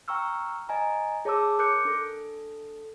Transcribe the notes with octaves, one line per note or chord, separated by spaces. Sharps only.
G5 A#5 C#6 E6 F6
D#5 G#5 A#5
G#4 C#5 A5 D6 E6
A#4 D6 F#6 G6 C#7
D4 A4